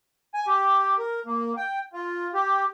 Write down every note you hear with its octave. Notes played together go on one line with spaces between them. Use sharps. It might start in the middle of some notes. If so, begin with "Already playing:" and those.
G#5
G4
A#4
A#3
G5
F4
G4